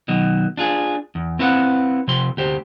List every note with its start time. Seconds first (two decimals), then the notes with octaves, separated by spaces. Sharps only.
0.08 B2 D#3 F#3
0.57 D4 F4 G#4
1.15 E2
1.39 C4 E4 B4 F5 F#5
2.08 C3 F3 C6
2.37 D2 G4 C5